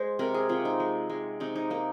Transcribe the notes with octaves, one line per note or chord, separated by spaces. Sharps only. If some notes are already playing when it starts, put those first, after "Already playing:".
Already playing: G#3 C5
C3 A#4
G#4
C3 F4
D#4
G#3
G#3
C3 D#4
D#4
A#3 D#4